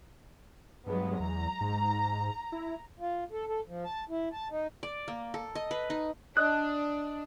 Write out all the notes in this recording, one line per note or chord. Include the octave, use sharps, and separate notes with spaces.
G2 F#3 G#3 B3
E2 A#5
G#2
E4
F4
A4
A4
F3
A5
E4
A5
D#4
D5
A#3
A4
D#5
B4
D#4
D4 D#5 F#6